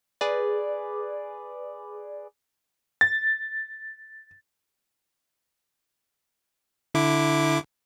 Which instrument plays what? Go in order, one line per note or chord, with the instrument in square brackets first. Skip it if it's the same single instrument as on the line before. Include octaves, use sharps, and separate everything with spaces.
[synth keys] G#4 B4 D5
[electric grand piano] A6
[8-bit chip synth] D3 E4 D6